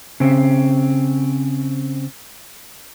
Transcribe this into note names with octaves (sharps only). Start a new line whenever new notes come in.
C#3 C4